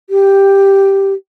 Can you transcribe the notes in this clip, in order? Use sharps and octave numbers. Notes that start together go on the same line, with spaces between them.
G4